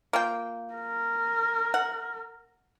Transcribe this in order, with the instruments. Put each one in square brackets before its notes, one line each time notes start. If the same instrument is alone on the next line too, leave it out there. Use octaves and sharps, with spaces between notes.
[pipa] A#3 F4 G5
[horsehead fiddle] A#4
[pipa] F#5